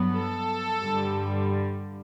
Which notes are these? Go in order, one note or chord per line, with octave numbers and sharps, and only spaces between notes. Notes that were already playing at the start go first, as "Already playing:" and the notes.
Already playing: G2 F#3 B3
A4
G2 D3 G3